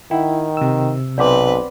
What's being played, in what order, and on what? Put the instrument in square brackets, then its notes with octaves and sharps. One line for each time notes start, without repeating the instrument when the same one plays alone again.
[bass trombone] D#3 [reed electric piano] E4 [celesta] F#5 G5
[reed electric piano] C3 E6
[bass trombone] B1 [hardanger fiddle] C4 B4 [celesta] D5 F#5 D6